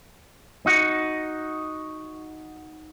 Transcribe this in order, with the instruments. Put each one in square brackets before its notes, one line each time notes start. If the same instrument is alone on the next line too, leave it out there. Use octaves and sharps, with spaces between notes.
[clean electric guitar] D#4 F#4